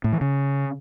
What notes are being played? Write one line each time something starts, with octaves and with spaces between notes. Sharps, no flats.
A2
E3
C#3